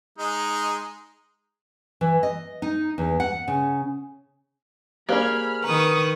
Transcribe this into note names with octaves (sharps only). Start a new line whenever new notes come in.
G#3 D#4
E3
D#5
D#4
E2
F#5
C#3
A#3 G4 G#4 C5 D5 B5 F6
D#3 B4 A#5 C#6 D#6